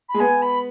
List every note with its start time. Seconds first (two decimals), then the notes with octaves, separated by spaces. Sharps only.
0.09 B5
0.14 G#3
0.20 B3 G#5
0.42 B5